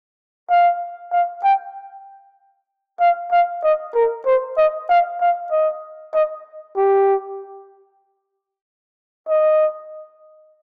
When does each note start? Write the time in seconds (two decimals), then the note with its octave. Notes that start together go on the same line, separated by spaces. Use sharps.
0.50 F5
1.12 F5
1.43 G5
3.00 F5
3.32 F5
3.64 D#5
3.95 A#4
4.26 C5
4.57 D#5
4.89 F5
5.21 F5
5.51 D#5
6.14 D#5
6.77 G4
9.29 D#5